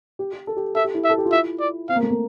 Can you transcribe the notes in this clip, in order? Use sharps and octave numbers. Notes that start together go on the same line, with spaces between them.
G4
G4
A4
G4
A4 E5
G4
E4
E5
A4
G4
F4
E4 E5
D5
C4 F5
A#3
A3
A#3